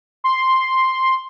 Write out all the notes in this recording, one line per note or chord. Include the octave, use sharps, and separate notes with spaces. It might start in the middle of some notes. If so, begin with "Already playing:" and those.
C6